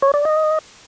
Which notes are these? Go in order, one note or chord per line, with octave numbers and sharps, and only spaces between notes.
C#5
D5
D#5